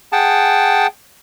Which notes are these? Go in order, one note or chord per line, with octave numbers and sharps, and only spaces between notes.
G#4 F#5 G5 A5